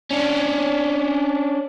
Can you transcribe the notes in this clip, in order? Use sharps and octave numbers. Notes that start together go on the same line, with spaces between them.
C#4 D4